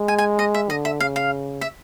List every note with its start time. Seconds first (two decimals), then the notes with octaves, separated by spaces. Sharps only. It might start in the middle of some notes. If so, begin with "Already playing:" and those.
Already playing: G#3
0.08 G#5
0.18 G#5
0.39 D#5
0.54 E5
0.70 D3 D#5
0.85 E5
1.00 C#3 F5
1.16 F5
1.61 E5